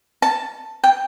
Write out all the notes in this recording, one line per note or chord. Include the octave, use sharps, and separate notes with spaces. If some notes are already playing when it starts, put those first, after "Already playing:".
A5
G5